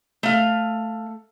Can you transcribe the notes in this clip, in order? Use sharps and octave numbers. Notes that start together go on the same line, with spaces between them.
A3 F5